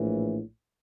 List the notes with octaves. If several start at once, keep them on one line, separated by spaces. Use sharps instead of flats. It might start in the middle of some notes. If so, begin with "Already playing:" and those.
Already playing: A#1 A2 E3